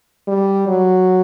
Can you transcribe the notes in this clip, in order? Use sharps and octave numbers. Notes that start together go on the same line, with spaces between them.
G3
F#3